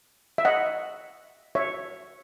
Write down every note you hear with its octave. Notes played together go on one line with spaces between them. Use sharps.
E5
D#5 F#5
C#5 E5